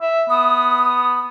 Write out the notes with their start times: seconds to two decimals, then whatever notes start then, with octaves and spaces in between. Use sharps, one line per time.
0.01 E5
0.29 B3 D#6